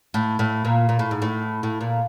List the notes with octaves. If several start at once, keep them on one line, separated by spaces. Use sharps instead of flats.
A2
A2
A#2
A#2
A2
G#2
A2
A2
A#2